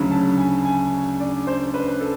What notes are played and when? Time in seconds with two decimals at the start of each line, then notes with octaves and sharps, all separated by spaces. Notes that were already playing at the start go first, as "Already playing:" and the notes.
Already playing: D2 C#3 F#3 B5
0.11 A5
0.38 G#5
0.65 G#5
1.20 D5
1.47 C5
1.74 B4
2.01 A4